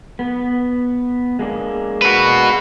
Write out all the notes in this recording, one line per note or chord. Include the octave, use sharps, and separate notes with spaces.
B3
G#3 A#3 D4
F#4 B4